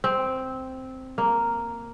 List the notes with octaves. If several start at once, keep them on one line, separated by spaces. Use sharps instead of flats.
C4
A#3